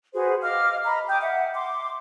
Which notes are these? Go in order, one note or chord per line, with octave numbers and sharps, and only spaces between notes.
F#4 G#4 B4 C5
D#5 F5 D6 F6
D#5 A#5 B5
G5 D6 D#6 G6
E5 F#5
C6 D6